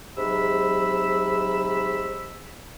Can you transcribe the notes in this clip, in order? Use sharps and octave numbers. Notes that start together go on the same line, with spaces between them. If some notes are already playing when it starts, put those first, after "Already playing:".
G#2 C3 F#3 B5 E6